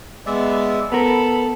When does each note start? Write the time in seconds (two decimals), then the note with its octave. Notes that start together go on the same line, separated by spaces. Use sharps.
0.26 G#3 B3 D5 E5
0.92 B3 A4 A#4 B5